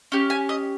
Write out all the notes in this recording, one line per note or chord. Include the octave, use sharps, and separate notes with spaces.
C#4 G4
G#5
D#5